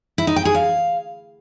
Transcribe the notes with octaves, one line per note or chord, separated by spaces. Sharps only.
E4
D#4
G5
G#4
F5